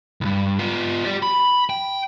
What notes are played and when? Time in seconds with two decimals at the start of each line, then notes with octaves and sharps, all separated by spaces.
0.21 C2 G2
0.59 B3 F4
1.06 G4 D5
1.22 B5
1.70 G5